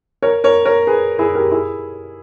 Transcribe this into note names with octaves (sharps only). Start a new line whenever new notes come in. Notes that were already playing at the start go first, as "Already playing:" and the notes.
A#4 C#5
A#4 C#5
A#4 C#5
G#4 B4
E4 G#4
G4 A#4
E4 G#4